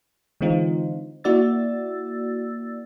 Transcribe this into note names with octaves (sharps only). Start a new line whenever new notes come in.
D3 E3 G#3 C4 D#4 F4
A#3 E4 F#4 D5 E6 A6